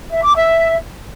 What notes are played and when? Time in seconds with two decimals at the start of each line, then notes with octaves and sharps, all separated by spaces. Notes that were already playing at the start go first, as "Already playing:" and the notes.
0.12 E5
0.23 D6
0.35 E5